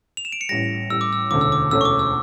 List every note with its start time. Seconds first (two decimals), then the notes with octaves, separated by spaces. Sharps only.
0.17 F7
0.25 E7
0.32 D7
0.41 C#7
0.49 A1 A2 G3 A#6
0.89 A1 A2 G3 E6
1.01 D6
1.13 E6
1.31 E1 D2 D3 A3 C#4 D6
1.41 E6
1.52 D6
1.71 E1 D2 D3 A3 C#4 E6
1.81 C#6
1.85 D6
1.99 E6